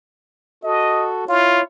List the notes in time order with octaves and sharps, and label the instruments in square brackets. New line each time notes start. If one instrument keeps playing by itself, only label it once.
[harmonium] F#4 A4 [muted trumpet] D#5
[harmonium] E4 C#5 [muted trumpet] F4